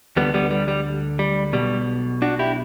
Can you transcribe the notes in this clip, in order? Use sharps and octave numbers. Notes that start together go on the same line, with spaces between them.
D2 D3 G3 B3
G3 B3
G3
G3
G3
B1 B2 G3
D4 F#4
E4 G4